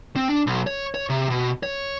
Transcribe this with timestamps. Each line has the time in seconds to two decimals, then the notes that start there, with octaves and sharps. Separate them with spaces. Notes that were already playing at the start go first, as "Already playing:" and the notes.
0.16 C4
0.28 D4
0.47 B1
0.67 C#5
0.94 C#5
1.09 C3
1.30 B2
1.63 C#5